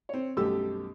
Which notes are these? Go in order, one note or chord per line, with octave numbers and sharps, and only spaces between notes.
C4 C#5
B1 F#2 G3 A3 G4 E6